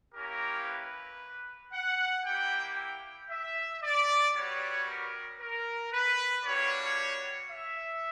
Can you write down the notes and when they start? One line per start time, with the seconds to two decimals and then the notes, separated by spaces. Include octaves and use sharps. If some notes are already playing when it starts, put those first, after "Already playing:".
0.14 A#3 C#4 E4 G4 A#4
0.67 B4
1.73 F#5
2.25 A#3 E4 G4 G5
2.77 G5
3.30 E5
3.83 D5
4.36 G3 B3 F#4 C#5
4.87 A#4
5.41 A#4
5.93 B4
6.45 G3 A#3 D4 F#4 C#5
7.50 E5